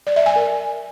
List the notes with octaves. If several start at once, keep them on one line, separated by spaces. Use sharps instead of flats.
D5
E5
G#5
A#4